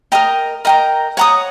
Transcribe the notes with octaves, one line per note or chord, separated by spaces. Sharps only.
A#4 D#5 G5 A#5
A#4 D#5 G5 A#5
C#5 F#5 A#5 D#6